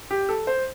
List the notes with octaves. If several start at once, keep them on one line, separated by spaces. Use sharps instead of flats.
G4
A4
C5